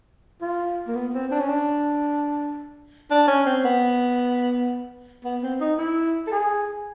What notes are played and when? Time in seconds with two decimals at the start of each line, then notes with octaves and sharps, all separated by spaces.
0.41 F4
0.88 A#3
0.95 B3
1.14 C4
1.31 D4
1.40 C#4
1.49 D4
3.11 D4
3.28 C#4
3.46 C4
3.64 B3
5.24 B3
5.43 C4
5.61 D#4
5.78 E4
6.27 A4
6.32 G#4